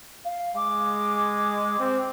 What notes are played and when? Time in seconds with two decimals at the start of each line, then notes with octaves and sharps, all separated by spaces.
0.24 F5
0.56 G#3 D6
1.79 C4